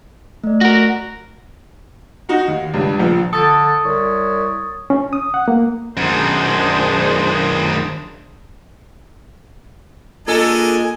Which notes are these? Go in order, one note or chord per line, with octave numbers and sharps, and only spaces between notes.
A3 D5
F#4 A#4
D#4 F#4 F#5
D#2
C#2 G2
A#1 F3
D3 A4 D#6 A6
C2 C#5
C#4
D#6
F#5
A#3
F#2 D#3 D4 G#4 C5
A#2 G#3 D4 A4 A#4 D#5 G#5